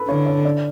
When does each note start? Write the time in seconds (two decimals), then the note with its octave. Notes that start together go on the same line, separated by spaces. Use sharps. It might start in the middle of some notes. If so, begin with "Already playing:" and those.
Already playing: A4 B4
0.08 D3 C#5
0.26 C#5
0.45 D5